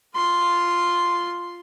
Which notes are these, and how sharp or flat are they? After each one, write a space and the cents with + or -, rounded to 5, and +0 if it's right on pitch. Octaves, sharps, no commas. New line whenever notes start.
F4 +0 C6 +0